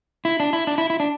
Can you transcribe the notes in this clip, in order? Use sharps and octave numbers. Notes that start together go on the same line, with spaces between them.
E4
D4
E4
D4
E4
E4
D4